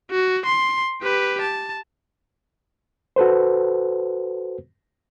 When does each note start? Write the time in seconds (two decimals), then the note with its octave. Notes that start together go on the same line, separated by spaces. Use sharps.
0.11 F#4
0.46 C6
1.03 G4 B4
1.42 A5
3.16 F#4 A4 B4 C5